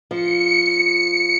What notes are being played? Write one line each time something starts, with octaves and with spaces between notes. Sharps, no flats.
F3 C#7